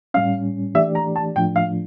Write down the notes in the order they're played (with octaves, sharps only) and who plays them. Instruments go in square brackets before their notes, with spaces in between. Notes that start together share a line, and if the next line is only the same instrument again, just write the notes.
[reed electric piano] A2 G3 C#4 [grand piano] F5
[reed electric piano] E3 A3 D4 G4 D5 [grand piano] E5
[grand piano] A#5
A5
[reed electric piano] A2 F3 A3 D4 F4 [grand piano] G5
[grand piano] F5